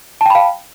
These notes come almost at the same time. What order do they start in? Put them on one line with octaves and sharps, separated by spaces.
A5 G5 B5 F5